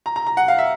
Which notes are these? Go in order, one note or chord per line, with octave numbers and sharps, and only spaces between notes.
A#5
A#5
A#5
F#5
F5
E5